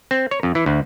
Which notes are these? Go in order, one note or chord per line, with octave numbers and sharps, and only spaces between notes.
C4
C#5
F2
E3
D2